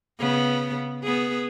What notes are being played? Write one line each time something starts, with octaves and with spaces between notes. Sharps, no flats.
C#3 B3
B3 G#4